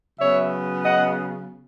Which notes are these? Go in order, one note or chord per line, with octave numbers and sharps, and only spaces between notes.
C#3 F#3 B3 C#5 E5
D#5 F#5